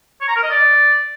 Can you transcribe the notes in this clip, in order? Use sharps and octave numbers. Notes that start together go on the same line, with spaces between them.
C#5
A#5
A#4
D#5
D5